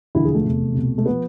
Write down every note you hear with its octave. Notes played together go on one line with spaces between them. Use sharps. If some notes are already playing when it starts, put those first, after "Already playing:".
E1 D2 D3 F3 E4
G#4
A3
F1 E2 C3
C2 B2
A3
F3 B3